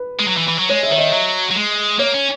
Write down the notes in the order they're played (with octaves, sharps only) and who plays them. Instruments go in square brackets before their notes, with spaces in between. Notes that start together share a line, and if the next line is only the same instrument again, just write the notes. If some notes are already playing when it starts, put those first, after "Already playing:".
Already playing: [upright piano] B4
[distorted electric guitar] G#3
F#3
E3
E3
F#3
[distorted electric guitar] G#3 [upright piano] C#5
[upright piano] E5
[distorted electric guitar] D#3 [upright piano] C#5
[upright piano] D#5
[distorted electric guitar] F#3
F#3
G#3
[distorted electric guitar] A#3 [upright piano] C#5
[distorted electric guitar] C#4